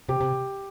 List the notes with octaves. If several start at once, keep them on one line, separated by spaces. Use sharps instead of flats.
C3 G4
C3